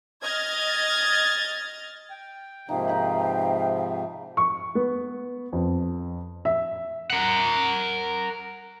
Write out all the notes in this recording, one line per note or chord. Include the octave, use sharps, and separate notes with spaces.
D#5 F6 G#6 A6
G5
G#2 C3 F3 A#3 D#4 E5 F5 G5
D#4 B4 B5
C#6
B3
F2
E5
A#4 F#5